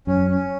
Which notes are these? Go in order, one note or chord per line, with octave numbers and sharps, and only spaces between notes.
F#2 C#4
C#4